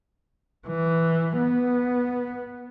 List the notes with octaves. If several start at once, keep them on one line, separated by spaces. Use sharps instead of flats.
E3
B3